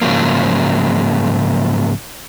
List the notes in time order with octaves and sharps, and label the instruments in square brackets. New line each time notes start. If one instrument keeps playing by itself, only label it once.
[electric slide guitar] G#2 C#3 F3 F#3 A#3